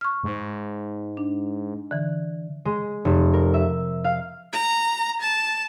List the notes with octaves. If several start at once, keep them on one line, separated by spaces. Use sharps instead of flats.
C#6 F6
G#2
D4
D3 E3
G#3
F1
A#4
E5
F5
A#5
A5